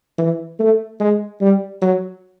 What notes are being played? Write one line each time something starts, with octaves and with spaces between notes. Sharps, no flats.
E3
A3
G#3
G3
F#3